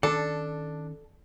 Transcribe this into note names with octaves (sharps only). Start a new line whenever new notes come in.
D#3 C#4 D4 A4